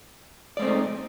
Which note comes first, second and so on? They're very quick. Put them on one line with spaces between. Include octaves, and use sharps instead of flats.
D5 G#3 C4 A3 D#4